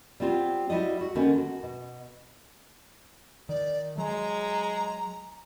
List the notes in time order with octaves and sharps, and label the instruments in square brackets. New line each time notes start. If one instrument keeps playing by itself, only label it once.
[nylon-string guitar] G3 B3 C4 F4 G4
G3 E4 F#4 G4 D5 D#5
F#4
D3 D#3 G3 A#3 B3 C#4
F#4
B2
[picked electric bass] D#3 [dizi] D5
[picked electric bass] F#3 [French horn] G#3 [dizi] A#5